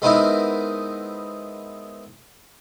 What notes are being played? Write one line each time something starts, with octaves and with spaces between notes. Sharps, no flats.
G#3 B3 C4 D#4 E4 A#4